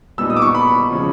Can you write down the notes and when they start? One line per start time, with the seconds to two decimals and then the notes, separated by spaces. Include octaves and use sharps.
0.18 A#2 G3 B3 D#4 E6
0.30 D#6
0.36 D6
0.42 C#6
0.55 B5
0.91 C#3 F3